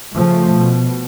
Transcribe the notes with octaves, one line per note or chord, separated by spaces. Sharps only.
C#3 F3 A3
B2